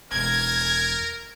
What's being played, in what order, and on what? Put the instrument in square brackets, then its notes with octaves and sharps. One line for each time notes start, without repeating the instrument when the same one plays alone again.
[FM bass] E1 [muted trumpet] A#4 [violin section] G#6